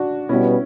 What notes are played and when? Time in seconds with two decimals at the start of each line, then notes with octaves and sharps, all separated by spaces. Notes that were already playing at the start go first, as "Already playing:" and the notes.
Already playing: D4 F#4
0.29 B2 G3 B3 C#4 E4